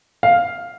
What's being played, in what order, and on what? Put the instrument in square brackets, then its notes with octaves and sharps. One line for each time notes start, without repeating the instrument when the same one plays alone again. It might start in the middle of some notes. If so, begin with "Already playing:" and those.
[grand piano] F5